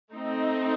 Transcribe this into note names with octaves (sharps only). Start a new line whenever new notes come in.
A3 C4 D#4